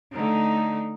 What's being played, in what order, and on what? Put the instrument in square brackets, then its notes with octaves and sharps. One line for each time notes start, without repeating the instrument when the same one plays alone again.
[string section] D3 A3 [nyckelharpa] D#4